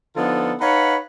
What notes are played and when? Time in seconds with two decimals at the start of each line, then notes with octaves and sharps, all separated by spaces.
0.17 D3 F3 B3 D#4 F4 A4
0.61 D#4 B4 C#5 F5 F#5 B5